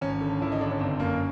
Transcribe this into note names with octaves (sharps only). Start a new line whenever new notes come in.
G#1 C#4
D3
G#1 E4
D#4
D3 D4
C#4
G1 C4
F#2 A#3